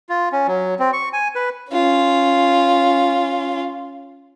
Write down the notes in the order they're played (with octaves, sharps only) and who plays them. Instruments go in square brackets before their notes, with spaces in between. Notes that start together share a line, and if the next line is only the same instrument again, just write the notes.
[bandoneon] F4
C#4
F#3
C4
C#6
G#5
B4
[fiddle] C#4 F4